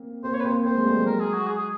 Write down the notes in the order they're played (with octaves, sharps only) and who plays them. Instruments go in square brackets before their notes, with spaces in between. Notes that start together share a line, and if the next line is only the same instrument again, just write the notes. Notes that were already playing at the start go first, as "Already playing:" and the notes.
Already playing: [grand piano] A#3 C4
[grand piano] A#3 C4 [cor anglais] C5
[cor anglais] C#5
B4
[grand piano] A#3 C4 [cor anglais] C5
[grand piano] A#3 C4 [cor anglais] C5
[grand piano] G#3 A#3
G3 A3
F#3 G#3
[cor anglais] A#4
G#4
F#4
G#4
G#4